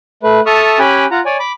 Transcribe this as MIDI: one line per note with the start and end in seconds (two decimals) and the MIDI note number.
0.23 0.40 57
0.23 0.40 71
0.46 0.78 69
0.46 0.78 76
0.46 0.78 81
0.46 0.78 85
0.46 0.78 87
0.46 0.78 89
0.79 1.05 61
0.79 1.05 67
0.79 1.05 79
0.79 1.05 80
0.79 1.05 83
0.79 1.05 90
1.11 1.20 65
1.11 1.20 78
1.11 1.20 82
1.26 1.37 73
1.26 1.37 74
1.26 1.37 80
1.39 1.52 83
1.39 1.52 86